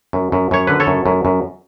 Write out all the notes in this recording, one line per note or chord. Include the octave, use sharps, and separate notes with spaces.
F#2
F#2
F#2 C#5
D3 B4
A4 C#5
F#2
F#2
F#2